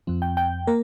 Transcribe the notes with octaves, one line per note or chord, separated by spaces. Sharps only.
F2 F3 C4
G5
G5
A#3 A#4